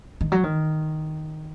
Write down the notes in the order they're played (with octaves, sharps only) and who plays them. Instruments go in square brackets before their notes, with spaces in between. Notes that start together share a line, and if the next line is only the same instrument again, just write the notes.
[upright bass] D#3
F#3
D#3